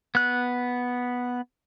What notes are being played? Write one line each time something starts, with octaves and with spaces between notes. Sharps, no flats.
B3 F#6